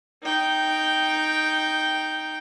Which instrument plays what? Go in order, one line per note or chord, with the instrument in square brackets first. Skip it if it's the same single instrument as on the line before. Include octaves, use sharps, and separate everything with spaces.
[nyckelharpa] D#4 G5